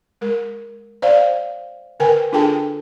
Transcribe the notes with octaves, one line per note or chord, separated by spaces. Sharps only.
G#3 A#4
C5 D5 F5
D3 A#4 B4 G5 G#5
D4 F4 G#4 A4 G5 A5